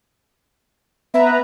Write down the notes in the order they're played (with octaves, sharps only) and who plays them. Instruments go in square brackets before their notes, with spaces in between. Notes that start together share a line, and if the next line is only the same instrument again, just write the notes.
[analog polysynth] B3 B4 A#5 [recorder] E5